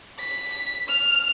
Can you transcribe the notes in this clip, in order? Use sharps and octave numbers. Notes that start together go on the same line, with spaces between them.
B6
F6